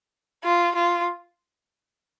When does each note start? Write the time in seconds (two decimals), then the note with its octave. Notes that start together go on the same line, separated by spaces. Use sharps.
0.44 F4
0.75 F4